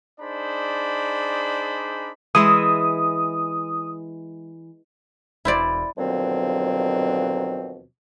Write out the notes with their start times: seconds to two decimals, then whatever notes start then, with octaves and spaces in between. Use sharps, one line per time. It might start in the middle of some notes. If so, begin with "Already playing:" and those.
0.20 D4 D#4 G#4 C5 D5 B5
2.35 E3 G#3 E5 D#6
5.45 E1 E4 C5 D5
5.97 D#2 B2 D3 F3 F#3 C4